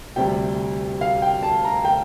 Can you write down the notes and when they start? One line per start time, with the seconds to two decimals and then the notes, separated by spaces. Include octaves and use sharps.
0.16 D2 C3 G3 G5
1.01 F5
1.22 G5
1.43 A5
1.64 A#5
1.85 G5